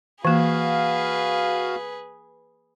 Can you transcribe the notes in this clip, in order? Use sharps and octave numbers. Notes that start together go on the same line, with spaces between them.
E3 A#3 F#4 G#4 B4 F5